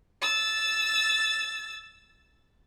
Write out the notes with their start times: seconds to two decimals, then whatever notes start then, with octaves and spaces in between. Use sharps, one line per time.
0.21 E6 A6